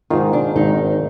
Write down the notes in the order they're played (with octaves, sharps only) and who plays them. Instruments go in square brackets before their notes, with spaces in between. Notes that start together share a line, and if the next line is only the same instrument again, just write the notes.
[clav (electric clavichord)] G#2 D#3 [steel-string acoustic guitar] F4
[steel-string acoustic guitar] D4
[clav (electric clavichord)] G#1 [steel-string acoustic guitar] D#4